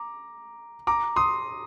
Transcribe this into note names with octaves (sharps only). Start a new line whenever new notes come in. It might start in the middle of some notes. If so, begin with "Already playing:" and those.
Already playing: A#5 D6
A#5 D6
C6 D#6